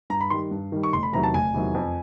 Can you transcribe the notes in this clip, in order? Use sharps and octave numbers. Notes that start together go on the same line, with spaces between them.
G2 A#5
B5
D#3 G3 C6
G2
D#3 G3
C#6
F1 C6
B5
E2 C3 D#3 F#3 A#5
A5
F1 G#5
E2 C3 D#3 F#3
F2